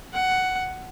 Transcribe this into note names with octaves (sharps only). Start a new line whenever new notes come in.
F#5